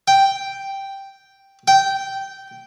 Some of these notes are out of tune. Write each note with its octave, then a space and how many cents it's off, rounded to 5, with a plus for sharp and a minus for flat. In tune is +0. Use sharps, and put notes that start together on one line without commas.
G5 +0
G5 -10